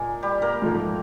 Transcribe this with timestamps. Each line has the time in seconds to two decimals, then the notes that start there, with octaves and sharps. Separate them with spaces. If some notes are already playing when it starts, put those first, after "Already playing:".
Already playing: A#2 G#3 A#3 G#4 A#4
0.23 G3 G4
0.42 A#3 A#4
0.62 G#2 F3 A3